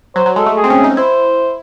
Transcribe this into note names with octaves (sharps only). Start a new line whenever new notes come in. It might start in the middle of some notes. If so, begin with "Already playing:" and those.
F#3 C5
F#3
G#3 A4
A3
G#4
C4
C#4
D#4
E4 C5